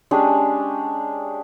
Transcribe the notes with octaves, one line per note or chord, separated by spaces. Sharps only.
G#3 C#4 D4 G4